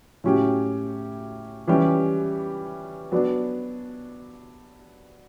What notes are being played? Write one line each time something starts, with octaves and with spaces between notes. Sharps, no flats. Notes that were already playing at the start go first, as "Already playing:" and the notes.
A2 F#3 C#4 G4
E3 G3 C#4 G4
F#3 B3 D4